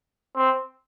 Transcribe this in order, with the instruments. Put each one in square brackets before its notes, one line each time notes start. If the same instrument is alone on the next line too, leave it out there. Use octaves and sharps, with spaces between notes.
[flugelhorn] C4